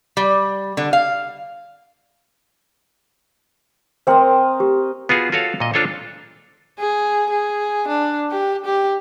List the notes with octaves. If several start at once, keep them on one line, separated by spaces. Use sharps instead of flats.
G3
D3
F5
C4 A#4 C5 D#5 G5 C6
G4
B3 F4 F#4 G#4
F4 F#4 A4 C#5 F5
A#2 D#5
D4 F4 A4 C5 C#5
G#4
G#4
D4
G4
G4